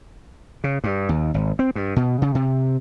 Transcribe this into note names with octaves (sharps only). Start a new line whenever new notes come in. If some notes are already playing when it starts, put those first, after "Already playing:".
C#3
G2
D#2
G#1
C4
G2
B2
C#3
C3